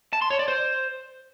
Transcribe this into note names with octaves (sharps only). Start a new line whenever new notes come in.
A5
C6
C#5
D5
C5